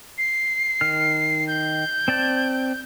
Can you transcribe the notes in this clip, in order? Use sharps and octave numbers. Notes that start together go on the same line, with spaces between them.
C7
D#3 F6
G6
C4 D5 A5